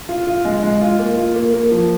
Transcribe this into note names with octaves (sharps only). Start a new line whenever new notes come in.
F4
F4
G#3
G#3
F4
A#3
F4
A#3
A#3
F3